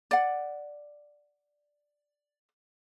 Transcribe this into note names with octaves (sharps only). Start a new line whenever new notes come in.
D5 F#5